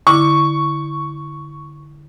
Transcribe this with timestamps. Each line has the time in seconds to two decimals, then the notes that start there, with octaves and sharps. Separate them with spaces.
0.07 D3 E4 C#6 D6